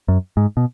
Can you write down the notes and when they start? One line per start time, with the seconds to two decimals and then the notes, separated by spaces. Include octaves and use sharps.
0.08 F#2
0.37 G#2
0.57 B2